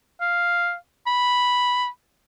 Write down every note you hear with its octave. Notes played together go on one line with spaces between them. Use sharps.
F5
B5